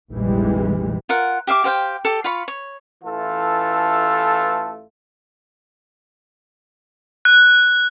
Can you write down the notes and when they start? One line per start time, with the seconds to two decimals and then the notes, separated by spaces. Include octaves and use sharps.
0.11 F1 A#1 E3 G3 G#3
1.09 F4 A#4 F#5
1.47 G4 E5 F5 D6
1.64 G4 C5 F5 G5
2.05 G4 A4
2.24 F4 F5 B5 C#6
2.48 C#5
3.04 A1 E3 A3 F4 A4
7.25 F#6